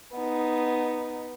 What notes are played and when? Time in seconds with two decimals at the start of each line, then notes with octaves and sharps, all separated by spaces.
0.14 B3 D#4